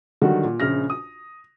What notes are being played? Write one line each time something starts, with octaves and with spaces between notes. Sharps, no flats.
D3 D#3 F#3 G3 F#4
A#2
A#1 C#3 F6 A#6
D#6